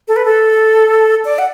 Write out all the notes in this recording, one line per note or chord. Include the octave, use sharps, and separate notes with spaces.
A4
B4
A4
D5
F#5